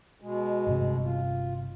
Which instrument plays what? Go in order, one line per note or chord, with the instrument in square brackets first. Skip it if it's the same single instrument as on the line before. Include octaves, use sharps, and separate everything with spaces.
[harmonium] B2 G#3
[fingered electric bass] G1 G2 C3
[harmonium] F4